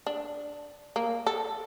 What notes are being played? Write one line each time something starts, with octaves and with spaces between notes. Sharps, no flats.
D4
A#3
A4